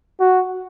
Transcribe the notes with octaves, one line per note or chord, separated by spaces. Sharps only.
F#4